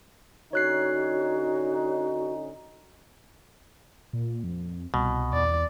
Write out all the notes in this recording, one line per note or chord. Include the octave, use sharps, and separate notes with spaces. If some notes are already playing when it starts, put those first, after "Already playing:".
D3 C#4 D#4 F#4 C#5 F#6 C7
A#2
F2
C2 B2
E2 D5